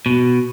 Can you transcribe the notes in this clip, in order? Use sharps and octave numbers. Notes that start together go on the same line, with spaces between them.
B2